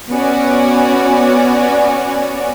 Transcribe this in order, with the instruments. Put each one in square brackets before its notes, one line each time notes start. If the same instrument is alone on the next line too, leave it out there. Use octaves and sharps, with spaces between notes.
[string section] B3 C#4 F#4 C#5 D5 G#5